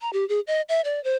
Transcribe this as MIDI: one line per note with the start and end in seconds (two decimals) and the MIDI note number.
0.01 0.10 82
0.13 0.27 67
0.29 0.40 68
0.47 0.62 75
0.69 0.81 76
0.85 1.02 74
1.04 1.16 72